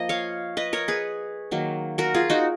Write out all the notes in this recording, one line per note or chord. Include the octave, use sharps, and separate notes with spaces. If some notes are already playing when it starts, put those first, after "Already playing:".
Already playing: F3 A#3 D#5
C#5 F5
B4 D#5
A#4 C#5
G#4 B4
D#3 F#3 A#3
F#4 A#4
F4 G#4
D#4 F#4